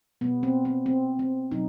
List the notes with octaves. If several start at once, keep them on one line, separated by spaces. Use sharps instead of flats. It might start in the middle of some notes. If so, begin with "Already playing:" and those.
B2 G3 B3
C4
C4
C4
C4
B2 F#3 D#4